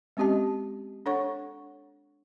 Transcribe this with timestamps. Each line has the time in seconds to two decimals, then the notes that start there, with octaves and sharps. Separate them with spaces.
0.17 G#3 C4 C#4 G4 D#5 A5
1.06 D4 A4 C#5 F#5 C#6